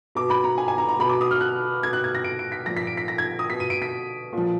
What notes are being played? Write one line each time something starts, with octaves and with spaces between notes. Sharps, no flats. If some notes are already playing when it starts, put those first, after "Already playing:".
B2 D6
B5
A#5
G#5
G#5
A#5
A#5
B2 B5
D6
D#6
F6
F#6
B2 G#6
F#6
G#6
A#6
D7
D7
B6
A#2 F3 A#6
B6
D7
B6
A#6
G#6
D#6
B2 B6
D#7
D7
B6
A#2 F3